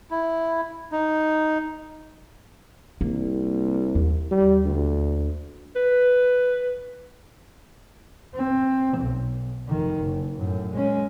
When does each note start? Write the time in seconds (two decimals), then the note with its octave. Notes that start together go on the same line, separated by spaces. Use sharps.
0.11 E4
0.92 D#4
3.01 C2 A#3
3.95 D#2
4.31 G3
4.64 D2
5.76 B4
8.34 C4
8.97 B1
9.69 F1 D#3
10.00 F#1
10.38 F#2 A2
10.72 G#3 C#4